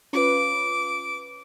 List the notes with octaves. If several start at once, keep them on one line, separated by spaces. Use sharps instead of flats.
C#4 F4 B4 D6